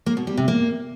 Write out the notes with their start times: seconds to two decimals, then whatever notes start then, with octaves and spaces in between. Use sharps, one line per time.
0.06 A#3
0.17 B2
0.27 G3
0.37 C3
0.48 A#3